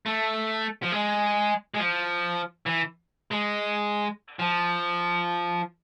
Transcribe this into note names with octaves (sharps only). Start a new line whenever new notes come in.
A3
F3
G#3
G#3
F3
E3
G#3
F3